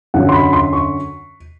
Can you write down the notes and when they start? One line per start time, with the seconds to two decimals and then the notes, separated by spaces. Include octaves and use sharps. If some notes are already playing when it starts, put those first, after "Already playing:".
0.14 F#2 D3 F#3 F#5
0.29 C6
0.33 B5
0.53 C6
0.73 C#6